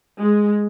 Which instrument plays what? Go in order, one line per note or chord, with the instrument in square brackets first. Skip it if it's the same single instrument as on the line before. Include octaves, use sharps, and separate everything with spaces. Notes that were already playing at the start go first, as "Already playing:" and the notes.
[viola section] G#3